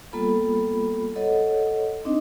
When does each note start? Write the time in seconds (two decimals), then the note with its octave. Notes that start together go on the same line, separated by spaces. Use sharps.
0.13 G3 A#3 B3 F4 A4 B5
1.16 A4 C#5 D#5 F#5
2.05 C4 D4 D#4 D#5